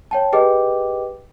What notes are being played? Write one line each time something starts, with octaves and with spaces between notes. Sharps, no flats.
C#5 G5 A5
G4 G#4 B4 D#5 G5 D6